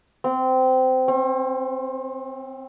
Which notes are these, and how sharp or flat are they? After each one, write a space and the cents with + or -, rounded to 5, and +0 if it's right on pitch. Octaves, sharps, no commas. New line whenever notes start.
C4 -20
C4 +40